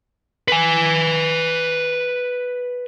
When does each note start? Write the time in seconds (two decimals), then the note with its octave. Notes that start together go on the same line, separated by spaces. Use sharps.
0.48 B4 G#5